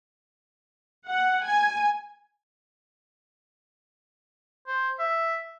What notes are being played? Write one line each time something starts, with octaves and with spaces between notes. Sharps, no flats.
F#5
G#5
C5
E5